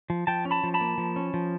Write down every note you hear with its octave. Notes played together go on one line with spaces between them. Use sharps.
F3
F3 G5 A5
C#4
A5 B5
F3
A5 B5
A#3
F3
C#4
F3